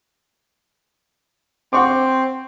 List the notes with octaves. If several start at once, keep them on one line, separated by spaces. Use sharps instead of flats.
C4 F#5 C#6 D6